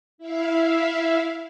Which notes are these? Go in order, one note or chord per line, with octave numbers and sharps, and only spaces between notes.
E4 E5 F5